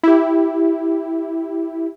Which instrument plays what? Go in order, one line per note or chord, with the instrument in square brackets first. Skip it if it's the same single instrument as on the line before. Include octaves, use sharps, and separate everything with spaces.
[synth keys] E4 G4